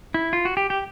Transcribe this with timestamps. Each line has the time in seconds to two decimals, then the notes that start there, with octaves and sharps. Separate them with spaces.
0.14 E4
0.33 F4
0.45 F#4
0.57 G4
0.70 G4